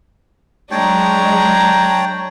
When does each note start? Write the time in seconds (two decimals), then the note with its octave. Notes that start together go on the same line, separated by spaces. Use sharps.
0.71 F#3 G#3 D4 C#5 G5 A5 A#5